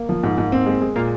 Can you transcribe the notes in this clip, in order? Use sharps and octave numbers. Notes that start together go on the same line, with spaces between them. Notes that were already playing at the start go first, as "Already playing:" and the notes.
Already playing: A#3
F3
G#2
G#2
C4
G#3
G#3
A#2 A#3